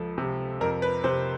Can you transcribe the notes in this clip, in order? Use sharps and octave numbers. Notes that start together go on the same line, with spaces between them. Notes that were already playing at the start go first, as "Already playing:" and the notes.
Already playing: C#2 F3 A4
C3
F2 A#4
B4
C3 C5